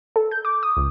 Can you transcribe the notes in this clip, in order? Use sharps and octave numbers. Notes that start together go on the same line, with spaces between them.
A4
G6
D6
D#6
C#2